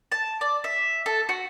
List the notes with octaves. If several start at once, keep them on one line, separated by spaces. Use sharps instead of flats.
A5
D5
E5
A4
F#4